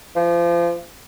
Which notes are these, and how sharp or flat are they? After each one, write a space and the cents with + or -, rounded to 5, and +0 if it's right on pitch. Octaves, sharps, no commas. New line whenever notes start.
F3 -30